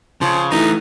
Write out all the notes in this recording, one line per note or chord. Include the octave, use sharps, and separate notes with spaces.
C#3 F3
E3 A3 D#4